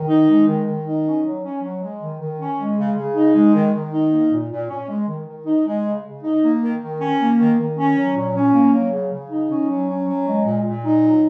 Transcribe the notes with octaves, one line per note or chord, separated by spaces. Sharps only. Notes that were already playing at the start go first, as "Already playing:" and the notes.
Already playing: D#3
D#4
G#3
D#3
D#3
D#4
C#4
F#3
C#4
F#3
G#3
D#3
D#3
C#4
G#3
C#3
C#3
D#4
G#3
D#3
D#3
D#4
A#3
A#2
A#2
C#4
G#3
D#3
D#3
D#4
G#3
C#3
C#3
D#4
A#3
D#3
D#3
C#4
A#3
D#3
D#3
C#4
F#3
A#2
C#4
A#3
F#3
C#3
C#3
D#4
C#4
F#3
C#4
F#3
G#3
A#2
A#2
D#4
F#3